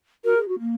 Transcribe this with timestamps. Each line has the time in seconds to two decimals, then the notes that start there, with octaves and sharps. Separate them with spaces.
0.25 F#4 A#4
0.36 G#4
0.48 F#4
0.59 A#3